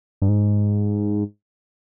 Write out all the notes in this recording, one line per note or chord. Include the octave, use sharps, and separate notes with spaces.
G2
G#2